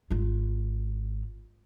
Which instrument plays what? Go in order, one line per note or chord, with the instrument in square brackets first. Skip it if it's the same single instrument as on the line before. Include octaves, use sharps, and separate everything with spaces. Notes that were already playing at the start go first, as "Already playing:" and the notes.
[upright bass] G#1 F4